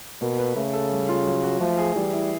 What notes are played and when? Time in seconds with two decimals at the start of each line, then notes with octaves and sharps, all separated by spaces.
0.21 B2 A#3
0.38 B4
0.56 C#3 A3
0.73 A4
0.91 G3
1.08 F4
1.26 F#3
1.43 F#4
1.60 F3 A3
1.78 G#4
1.96 E3 G3
2.13 E4